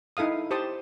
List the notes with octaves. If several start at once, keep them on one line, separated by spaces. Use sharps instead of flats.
D#4 E4 A4 F5 D#6
G4 C5 A5 D#6